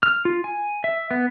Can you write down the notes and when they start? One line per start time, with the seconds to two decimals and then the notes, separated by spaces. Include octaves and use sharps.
0.03 F6
0.25 F4
0.44 G#5
0.84 E5
1.11 B3